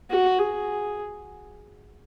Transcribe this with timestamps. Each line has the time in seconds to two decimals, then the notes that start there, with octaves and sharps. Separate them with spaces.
0.10 F#4
0.39 G#4